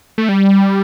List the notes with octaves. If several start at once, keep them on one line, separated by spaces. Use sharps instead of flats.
A3
G3